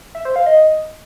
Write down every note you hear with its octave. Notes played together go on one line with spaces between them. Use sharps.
E5
C5
F5
D#5